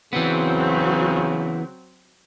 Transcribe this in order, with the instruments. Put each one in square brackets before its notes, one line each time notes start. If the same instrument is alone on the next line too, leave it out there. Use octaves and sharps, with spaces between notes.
[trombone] C#3 [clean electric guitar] E3 B3 [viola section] F#3 C4 F#4